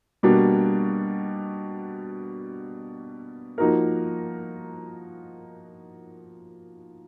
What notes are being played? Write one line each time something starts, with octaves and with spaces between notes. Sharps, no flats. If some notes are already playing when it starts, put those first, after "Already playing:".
B2 G3 A#3 D4 F#4
F3 A#3 D#4 F#4 A#4